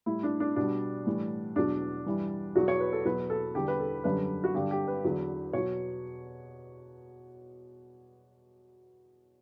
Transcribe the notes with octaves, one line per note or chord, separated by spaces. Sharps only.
A2 G3 E4
D4
D4
B2 G3 D4
A2 E3 G3
E2 B2 F#3 D4
G2 E3 G3
E2 B2 F#3 F#4
C#5
B4
A4
E2 B2 F#3 B4
A4
E2 D3 G3 G4
B4
A4
F#2 D3 G3 B4
F#4
G2 D3 G3 G4
G4
B4
E2 D3 F#3
B2 F#3 C#5